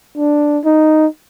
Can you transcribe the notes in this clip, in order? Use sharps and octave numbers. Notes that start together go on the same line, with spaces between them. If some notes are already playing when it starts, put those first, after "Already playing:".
D4
D#4